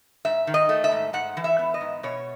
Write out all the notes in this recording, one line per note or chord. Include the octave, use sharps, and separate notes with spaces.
G#2 E5
D#3
D#5
A3
E5
G#2
G#2 F#5
E3
E5
B3
D#5
G#2
B2 C#5